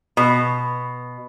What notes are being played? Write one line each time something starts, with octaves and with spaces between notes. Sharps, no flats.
B2